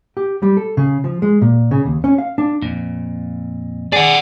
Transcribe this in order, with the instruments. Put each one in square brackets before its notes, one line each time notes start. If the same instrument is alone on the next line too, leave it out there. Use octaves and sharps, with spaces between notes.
[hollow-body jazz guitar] G4
G3
A4
C#3
F3
G#3
A#2
C#3
D#2
C#4
F5
D4
[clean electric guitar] F2 A#2
[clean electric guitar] G#4 [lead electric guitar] D5 F#5